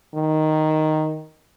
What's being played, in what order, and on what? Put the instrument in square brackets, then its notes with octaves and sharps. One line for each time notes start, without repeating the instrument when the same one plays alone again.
[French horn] D#3